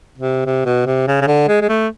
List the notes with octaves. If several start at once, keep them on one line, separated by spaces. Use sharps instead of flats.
C3
C3
B2
C3
C#3
C#3
D3
G#3
G#3
A3